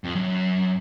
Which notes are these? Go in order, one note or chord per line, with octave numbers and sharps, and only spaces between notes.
F2
F#2